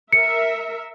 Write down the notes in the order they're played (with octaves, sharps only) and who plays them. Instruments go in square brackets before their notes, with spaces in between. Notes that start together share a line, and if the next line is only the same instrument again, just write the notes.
[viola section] A#4 E5 [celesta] C#7